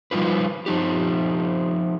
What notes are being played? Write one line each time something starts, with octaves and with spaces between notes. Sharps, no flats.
F3 G3 D#4 F4 B4
F3 D#4 G4